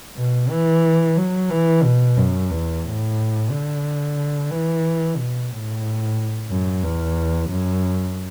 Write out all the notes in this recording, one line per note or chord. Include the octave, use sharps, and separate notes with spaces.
B2
E3
F#3
E3
B2
F#2
E2
A2
D3
E3
B2
A2
F#2
E2
F#2